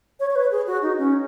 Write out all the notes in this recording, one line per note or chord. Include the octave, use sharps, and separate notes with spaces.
C#5
C#5
B4
G#4
F#4
D#4
C#4